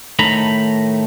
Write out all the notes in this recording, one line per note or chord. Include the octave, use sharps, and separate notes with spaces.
A2 D#3 A3 D#4 A#5 B5